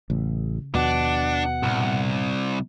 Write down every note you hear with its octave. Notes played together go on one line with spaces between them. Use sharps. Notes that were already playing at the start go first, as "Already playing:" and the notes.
A1 C#3
D#2 B2 D#3 F3 D4 F#5
C2 G2 A#2